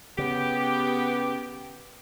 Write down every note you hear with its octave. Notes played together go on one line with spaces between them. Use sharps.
C#3 B3 G4